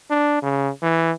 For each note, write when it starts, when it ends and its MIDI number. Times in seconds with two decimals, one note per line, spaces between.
0.10 0.40 62
0.42 0.70 49
0.82 1.12 52